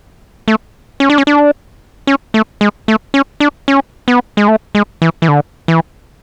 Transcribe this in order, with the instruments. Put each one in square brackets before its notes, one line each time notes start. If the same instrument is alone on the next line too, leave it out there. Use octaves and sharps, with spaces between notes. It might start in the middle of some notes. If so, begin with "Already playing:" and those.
[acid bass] A3
C#4
D4
C#4
D4
C#4
A3
G#3
A3
C#4
D4
C#4
B3
G#3
A3
G#3
E3
E3
D3
E3